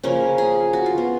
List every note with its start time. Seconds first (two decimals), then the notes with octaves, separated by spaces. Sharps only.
0.03 C#3 F3 A#3 C#4
0.38 G#4
0.73 F#4
0.86 F4
0.98 B3